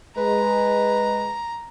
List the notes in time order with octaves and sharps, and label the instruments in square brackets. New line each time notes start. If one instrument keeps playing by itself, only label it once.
[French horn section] G#3 [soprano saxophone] B4 [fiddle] A#5